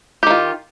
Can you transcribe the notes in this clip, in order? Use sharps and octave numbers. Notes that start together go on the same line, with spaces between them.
D#3 F4 G4